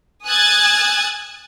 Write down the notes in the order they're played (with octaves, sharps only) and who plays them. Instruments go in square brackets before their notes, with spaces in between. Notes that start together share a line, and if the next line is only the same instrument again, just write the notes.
[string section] G#5 D#6 E6 F#6 G#6 A6